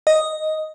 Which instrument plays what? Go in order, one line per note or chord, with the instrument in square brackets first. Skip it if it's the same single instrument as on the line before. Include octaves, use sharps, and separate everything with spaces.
[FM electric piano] D#5